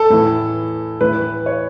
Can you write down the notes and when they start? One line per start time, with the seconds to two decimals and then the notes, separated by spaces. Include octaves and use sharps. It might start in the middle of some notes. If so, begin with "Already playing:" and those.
Already playing: A4
0.10 A2 E3
1.01 A2 E3 B4
1.46 C#5